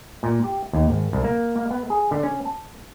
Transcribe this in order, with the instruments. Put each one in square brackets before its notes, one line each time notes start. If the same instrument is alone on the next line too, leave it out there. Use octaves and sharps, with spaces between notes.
[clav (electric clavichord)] A#2
G4
D#2
G#1
C2
A#3
A#3
B3
G#4
D3
C#4
A5